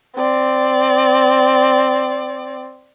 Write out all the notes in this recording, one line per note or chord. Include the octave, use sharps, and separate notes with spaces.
C4 D5